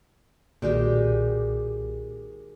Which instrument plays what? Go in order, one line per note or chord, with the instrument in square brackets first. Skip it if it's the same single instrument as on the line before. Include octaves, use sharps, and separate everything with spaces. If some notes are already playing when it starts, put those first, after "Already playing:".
[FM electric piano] B1 A#2 [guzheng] D#3 G#3 G4 [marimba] F#4 D5